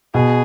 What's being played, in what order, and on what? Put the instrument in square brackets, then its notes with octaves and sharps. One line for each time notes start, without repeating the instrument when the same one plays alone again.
[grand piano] B2 [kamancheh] G#4